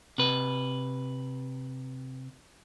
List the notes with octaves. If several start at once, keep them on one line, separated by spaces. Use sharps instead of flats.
C3 B4